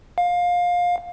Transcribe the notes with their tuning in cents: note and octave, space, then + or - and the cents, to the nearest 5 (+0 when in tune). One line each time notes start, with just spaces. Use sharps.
F5 +20